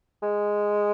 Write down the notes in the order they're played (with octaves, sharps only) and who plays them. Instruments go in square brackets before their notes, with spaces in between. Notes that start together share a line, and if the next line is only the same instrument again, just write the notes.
[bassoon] G#3